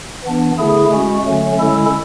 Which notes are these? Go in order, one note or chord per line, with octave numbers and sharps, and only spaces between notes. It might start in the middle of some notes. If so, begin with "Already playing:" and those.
E3 B3 D4
D3 A3 E4 G#4
G#3 C#4 F#4
D3 F#3 A3 C#4
D3 G#3 C#4 E4 A4